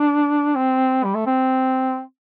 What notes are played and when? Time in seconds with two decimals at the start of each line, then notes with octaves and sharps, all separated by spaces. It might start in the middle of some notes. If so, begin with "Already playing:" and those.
Already playing: D4
0.55 C4
1.04 G3
1.15 A3
1.26 C4